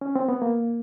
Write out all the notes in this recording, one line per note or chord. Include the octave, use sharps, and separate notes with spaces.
C#4
C4
B3
A#3